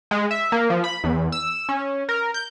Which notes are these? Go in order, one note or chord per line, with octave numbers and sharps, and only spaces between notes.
G#3
E5
A#3
F3
B5
E2
E6
C#4
A#4
G6